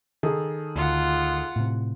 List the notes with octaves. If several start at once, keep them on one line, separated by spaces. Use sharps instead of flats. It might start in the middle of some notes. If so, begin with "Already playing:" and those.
D#3 G#4 A4
D2 F4 F#5
A2 C3